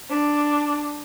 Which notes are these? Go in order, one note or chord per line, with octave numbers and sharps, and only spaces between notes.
D4